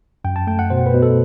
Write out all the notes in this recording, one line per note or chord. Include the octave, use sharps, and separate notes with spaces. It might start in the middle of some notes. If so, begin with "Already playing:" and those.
F#2 G5
A5
A3 G5
F#5
B2 C5
B4
B2
A4